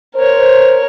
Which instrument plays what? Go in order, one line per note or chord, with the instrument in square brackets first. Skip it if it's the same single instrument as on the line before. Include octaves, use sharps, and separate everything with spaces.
[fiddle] A#4 C#5 [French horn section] C5